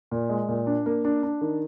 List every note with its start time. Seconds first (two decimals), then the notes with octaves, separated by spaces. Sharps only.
0.11 A#2
0.29 G#3
0.48 A#2
0.67 D4
0.86 A#3
1.05 D4
1.23 D4
1.41 D#3